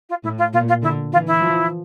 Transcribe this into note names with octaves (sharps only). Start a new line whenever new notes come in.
F4
A2 E4
F4
A#2 F4
F4
D3 E4
E3 F4
E4
F3